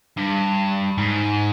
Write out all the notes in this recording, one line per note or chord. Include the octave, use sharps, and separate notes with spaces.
G2
G#2